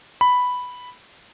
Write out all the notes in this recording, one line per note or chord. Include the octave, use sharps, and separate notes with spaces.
B5